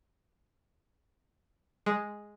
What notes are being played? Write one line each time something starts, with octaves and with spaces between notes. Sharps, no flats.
G#3